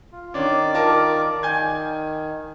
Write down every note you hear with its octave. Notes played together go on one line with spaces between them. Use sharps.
F4
D#3 C#4 D4 D5 D6
F4 A#4 A5
D#3 G#5 G6 G#6